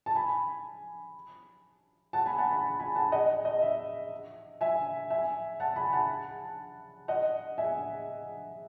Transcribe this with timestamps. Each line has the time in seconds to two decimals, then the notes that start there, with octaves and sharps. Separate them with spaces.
0.06 A5
0.15 G#5 B5
2.13 F#5 A5
2.26 G#5 B5
2.38 F#5 A5
2.50 G#5 B5
2.80 G#5 B5
2.96 F#5 A5
3.12 D#5 F#5
3.45 D#5
3.62 E5
4.61 E5 G#5
5.10 E5 G#5
5.60 F#5 A5
5.76 G#5 B5
5.93 F#5 A5
7.08 D#5 F#5
7.58 E5 G#5